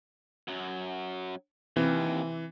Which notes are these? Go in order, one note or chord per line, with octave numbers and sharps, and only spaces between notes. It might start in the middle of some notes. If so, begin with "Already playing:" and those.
F#2 F#3
D#2 C3 E3 C4